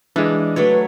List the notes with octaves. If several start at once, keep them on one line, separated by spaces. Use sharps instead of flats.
E3 G#3 D4
F#3 A3 B4 C#5